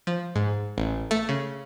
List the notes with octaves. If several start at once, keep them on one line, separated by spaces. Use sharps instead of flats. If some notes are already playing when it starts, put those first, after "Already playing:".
F3
G#2
A1
A3
C#3